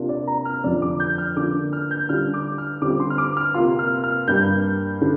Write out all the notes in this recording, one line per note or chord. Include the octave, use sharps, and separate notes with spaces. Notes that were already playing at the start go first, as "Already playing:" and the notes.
Already playing: C3 A#3 D4 F4
D5
A#5
F6
F2 D3 F3 D4 D5
D6
G6
F6
D3 A#3 D4 F4 D6
F6
G6
D3 G3 D4 F4 F6
D6
F6
D3 G3 C4 F4 D6
C6
F6
D6
F6
C3 A#3 F4 C6
F6
F6
G2 G3 A#3 G6
D3